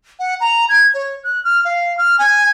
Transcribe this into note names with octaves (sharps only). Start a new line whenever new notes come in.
F#5
A#5
G#6
C#5
F#6
F6
F5
F6
G#5